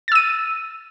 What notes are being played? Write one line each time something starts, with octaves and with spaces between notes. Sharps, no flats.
E6 A6 D#7